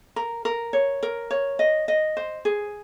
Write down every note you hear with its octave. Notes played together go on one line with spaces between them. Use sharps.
A#4
A#4
C#5
A#4
C#5
D#5
D#5
C5
G#4